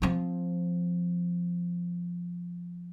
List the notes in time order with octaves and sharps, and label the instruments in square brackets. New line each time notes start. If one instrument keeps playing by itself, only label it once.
[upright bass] F3 C4